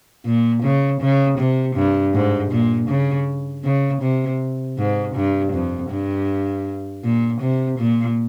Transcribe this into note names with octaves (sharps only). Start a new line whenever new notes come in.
A#2
C#3
C#3
C3
G2
G#2
A#2
C#3
C#3
C3
G#2
G2
F2
G2
A#2
C3
A#2